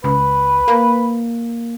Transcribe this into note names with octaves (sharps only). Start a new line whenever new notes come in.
C#2 B4
A#3